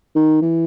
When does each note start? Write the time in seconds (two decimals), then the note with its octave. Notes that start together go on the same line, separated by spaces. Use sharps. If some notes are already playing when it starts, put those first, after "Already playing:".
0.15 D#3
0.42 E3